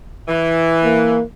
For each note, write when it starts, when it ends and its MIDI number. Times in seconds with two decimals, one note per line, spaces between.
0.28 1.19 52
0.84 1.23 58